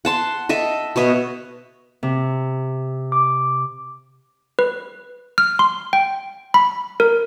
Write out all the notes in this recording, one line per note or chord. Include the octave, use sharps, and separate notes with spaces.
F#5 A5 C6
A4 D#5 E5
B2 C#5 D#5 E5
C3
D6
B4
F6
C6
G5
B5
A#4